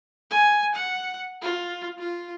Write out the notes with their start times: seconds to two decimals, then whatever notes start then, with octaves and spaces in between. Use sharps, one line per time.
0.31 G#5
0.75 F#5
1.42 F4
1.98 F4